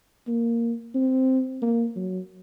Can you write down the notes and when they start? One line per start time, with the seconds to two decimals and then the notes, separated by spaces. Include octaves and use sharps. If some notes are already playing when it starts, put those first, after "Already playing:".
0.28 A#3
0.95 C4
1.62 A#3
1.96 F#3